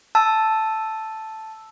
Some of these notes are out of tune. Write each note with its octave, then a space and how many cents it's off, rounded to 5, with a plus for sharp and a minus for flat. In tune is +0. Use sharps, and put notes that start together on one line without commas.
A5 +0 E6 +0